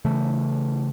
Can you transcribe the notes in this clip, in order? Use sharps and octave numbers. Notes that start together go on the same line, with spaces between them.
C#3 E3 A3